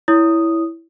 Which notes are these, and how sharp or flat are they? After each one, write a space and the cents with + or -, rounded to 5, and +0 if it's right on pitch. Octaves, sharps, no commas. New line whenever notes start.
E4 +0 C#5 +25 D#6 -5